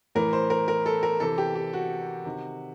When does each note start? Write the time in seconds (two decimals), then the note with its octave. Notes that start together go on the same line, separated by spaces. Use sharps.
0.15 A2 E3 A#4
0.33 C5
0.50 A#4
0.68 A#4
0.86 A4
1.03 A#4
1.20 C3 E3 A4
1.38 G4
1.56 G4
1.73 F#4
2.26 C3 D#3